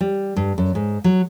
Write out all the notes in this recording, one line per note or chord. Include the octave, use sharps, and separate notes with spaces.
G3
G2
F#2
G#2
F#3